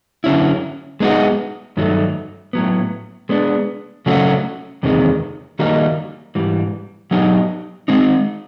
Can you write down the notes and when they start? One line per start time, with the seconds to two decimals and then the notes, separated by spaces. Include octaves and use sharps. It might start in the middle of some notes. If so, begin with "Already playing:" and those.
0.24 D3 F#3 A3 C#4 E4
1.00 G#3 B3 D#4 F#4
1.77 G2 D#3 F#3 A3
2.53 A2 F#3 B3
3.29 G#3 B3 D4
4.06 C#3 F#3 A3 C#4 F#4
4.83 E2 C3 D#3 G#3
5.59 D#3 G3 A#3 D#4 F#4
6.35 G#2 E3 G3
7.11 F#3 B3 D#4 G4
7.88 G#3 C4 D#4